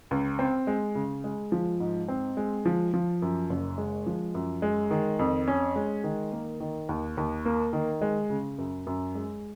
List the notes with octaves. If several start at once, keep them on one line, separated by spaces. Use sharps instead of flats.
C#2
C4
G#3
C#3
G#3
F3
G#2
C4
G#3
F3
F3
F#2
F#1
G#3
F3
F#2
G#3
D#3
F2
C#4
G#3
D#3
A#3
D#3
D#2
D#2
A#3
D#3
G#3
C#3
F#2
F#2
G#3